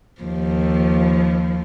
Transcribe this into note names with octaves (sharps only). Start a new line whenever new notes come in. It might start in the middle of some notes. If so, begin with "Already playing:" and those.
D#2 F3